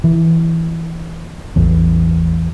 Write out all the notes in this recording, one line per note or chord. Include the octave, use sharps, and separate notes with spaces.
E3
A1 E2